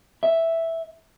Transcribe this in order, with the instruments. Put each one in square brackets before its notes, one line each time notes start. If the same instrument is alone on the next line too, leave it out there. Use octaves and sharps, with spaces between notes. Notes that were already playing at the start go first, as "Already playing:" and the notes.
[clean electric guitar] E5